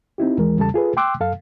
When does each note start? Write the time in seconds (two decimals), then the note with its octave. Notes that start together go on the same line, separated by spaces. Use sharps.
0.18 C4 D#4 E4 G4
0.38 D#2 E3 G#3 A#4
0.57 E2 C#3 G3 A4 A5
0.74 F4 G#4 A4 B4
0.97 G5 C6 D6 E6 F#6
1.20 F#2 A4 F5